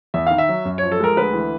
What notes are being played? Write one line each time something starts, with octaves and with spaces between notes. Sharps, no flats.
E2 E5
D#3 F5
E5
F#3
F#2
F3 C#5
A4
G#3 A#4
D2 B4
E3